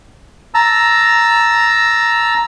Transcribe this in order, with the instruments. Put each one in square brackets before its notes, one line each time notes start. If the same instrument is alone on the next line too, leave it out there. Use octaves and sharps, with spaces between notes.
[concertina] A5 A#5 E6